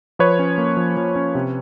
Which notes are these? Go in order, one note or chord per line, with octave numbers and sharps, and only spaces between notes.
F3 B4 C#5
C#4
A#3
F3
F3
C#4
C3